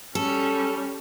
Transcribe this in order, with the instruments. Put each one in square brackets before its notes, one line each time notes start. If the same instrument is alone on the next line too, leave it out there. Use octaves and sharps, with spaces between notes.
[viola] G3 C#4 [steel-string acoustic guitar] A4